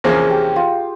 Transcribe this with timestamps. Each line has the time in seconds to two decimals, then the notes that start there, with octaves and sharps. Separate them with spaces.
0.04 E2 C3 F3 A#3 C#4 G#4
0.30 G4
0.56 F4